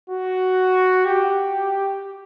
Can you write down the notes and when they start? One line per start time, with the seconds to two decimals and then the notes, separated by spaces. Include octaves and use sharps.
0.10 F#4
1.05 G4